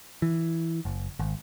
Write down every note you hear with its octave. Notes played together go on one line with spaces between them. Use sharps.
E3
F#1
G#1